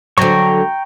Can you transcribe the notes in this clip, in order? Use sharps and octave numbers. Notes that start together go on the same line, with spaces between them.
D3 F#3 G5 A#5 C#6